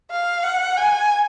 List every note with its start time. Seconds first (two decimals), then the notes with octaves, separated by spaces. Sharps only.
0.11 F5
0.43 F#5
0.77 G#5